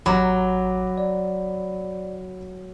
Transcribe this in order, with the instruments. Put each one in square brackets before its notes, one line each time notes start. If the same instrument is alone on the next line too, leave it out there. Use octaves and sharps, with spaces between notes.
[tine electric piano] A1 D6 [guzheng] F#3 [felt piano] A#5 B5
[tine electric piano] D5